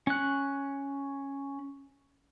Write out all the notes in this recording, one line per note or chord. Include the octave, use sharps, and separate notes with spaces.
C#4 F#6